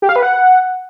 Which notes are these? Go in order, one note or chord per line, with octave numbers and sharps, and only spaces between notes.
G4
F5
B4
F#5